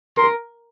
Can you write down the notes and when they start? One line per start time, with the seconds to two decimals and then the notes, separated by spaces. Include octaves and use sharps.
0.17 A#4 C6